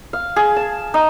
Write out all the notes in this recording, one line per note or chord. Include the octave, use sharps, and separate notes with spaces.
F5
G#4
A5
D#4